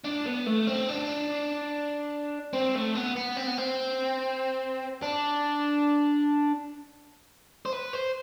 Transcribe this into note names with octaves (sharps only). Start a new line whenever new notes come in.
D4
B3
A3
C4
D4
C4
A3
B3
B3
C4
B3
C4
D4
C5
B4
C5